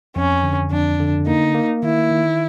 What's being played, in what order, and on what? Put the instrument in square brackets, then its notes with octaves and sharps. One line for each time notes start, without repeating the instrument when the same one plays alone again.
[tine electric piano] F2 [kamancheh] C#4
[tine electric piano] D3
[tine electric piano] F2 [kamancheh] D4
[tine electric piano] D3
[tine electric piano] A#3 [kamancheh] D#4
[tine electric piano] A#3
[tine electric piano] D#3 [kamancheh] E4
[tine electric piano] D#3